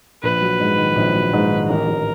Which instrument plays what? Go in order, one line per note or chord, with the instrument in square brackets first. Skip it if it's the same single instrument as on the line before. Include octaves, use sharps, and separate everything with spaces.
[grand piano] A#1 [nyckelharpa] B4
[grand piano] F#3
G#2
D#3
A#1
F#3
G#2
D#3
[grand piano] A1 [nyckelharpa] A#4
[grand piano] A1